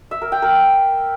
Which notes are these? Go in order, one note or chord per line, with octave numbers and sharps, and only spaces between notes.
E5
A#4
G5
A#4